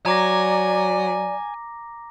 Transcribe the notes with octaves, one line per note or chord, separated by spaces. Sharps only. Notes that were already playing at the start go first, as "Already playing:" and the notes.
F#3 D5 G#5 A#5 D6 A#6